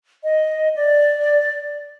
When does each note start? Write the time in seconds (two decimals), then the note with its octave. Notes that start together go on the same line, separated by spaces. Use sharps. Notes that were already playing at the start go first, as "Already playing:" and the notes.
0.23 D#5
0.76 D5